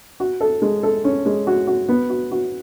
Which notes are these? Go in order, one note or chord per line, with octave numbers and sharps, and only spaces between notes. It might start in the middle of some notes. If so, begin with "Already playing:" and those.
F#4
A4
G#3
A4
C#4
G#3
F#4
F#4
B3
F#4
F#4